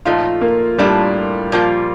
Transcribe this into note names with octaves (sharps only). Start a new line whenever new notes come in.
A#2 F3 A3 D#4 F4
A#3
A2 G3 A3 D4 F4
A#2 F3 A#3 F4